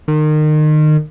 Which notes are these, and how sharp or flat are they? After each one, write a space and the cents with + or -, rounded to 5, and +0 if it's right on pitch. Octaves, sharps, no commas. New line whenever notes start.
D#3 -30